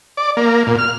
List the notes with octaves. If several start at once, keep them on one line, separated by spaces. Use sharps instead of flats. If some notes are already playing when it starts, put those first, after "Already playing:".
D5
A#3
A#2
F6